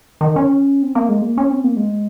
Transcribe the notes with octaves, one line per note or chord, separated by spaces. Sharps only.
D#3
C#4
C4
A#3
G#3
A#3
C#4
C4
A#3
G#3